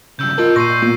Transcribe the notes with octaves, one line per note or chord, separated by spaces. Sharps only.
G2 C#3 E6 G6
F4 A#4 D#5 A5 E6
A#2 C6 C#6 G6 A#6 C7 D#7
A#3 B3 F4